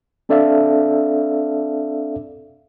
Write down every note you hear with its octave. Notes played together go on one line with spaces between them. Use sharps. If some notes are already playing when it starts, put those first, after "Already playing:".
C4 D4 A4 D5 E5 F5